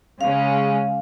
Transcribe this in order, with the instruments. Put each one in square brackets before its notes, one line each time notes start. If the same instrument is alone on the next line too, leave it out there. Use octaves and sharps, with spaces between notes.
[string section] C#3 G#3 C#4 [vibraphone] F5